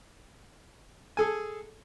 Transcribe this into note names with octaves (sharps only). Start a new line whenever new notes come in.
G#4 A4 G#5